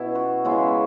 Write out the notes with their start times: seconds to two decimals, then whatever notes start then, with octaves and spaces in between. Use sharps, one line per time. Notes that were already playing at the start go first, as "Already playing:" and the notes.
Already playing: B2 B3 C#4 E4
0.15 F#4
0.45 C#3 G#3 B3 E4